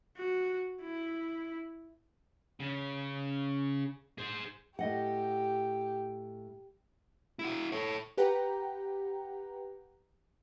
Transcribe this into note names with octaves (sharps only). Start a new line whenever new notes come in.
F#4
E4
C#3
G#4 C5
A2 G4 D#5 F#5
E4 F#4
A4 C#5
G4 B4 F#5 G5 A#5